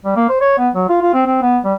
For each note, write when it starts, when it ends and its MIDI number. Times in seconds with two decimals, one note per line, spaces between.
0.05 0.15 55
0.16 0.27 58
0.29 0.37 72
0.41 0.57 73
0.58 0.69 59
0.74 0.87 54
0.89 0.99 65
1.02 1.13 65
1.14 1.22 60
1.26 1.41 60
1.42 1.58 59
1.64 1.74 55